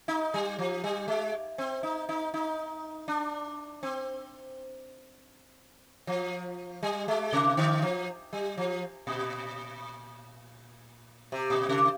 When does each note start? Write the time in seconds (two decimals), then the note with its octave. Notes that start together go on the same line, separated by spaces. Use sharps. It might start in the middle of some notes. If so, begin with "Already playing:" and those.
0.08 D#4
0.34 G3
0.59 F3
0.84 G3
1.08 G#3
1.58 C4
1.83 D#4
2.09 D#4
2.34 D#4
3.08 D4
3.83 C4
6.07 F3
6.83 G3
7.08 G#3
7.33 C3
7.57 D3
7.82 F3
8.33 G3
8.57 F3
9.07 A#2
11.32 C3
11.50 A#2
11.69 C3